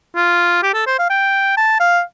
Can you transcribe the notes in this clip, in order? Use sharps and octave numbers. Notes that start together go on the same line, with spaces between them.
F4
G4
A4
C5
F5
G5
A5
F5